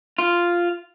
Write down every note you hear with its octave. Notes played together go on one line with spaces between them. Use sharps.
F4